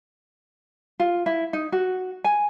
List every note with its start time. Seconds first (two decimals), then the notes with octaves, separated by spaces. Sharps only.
1.00 F4
1.26 E4
1.53 D#4
1.72 F#4
2.24 G#5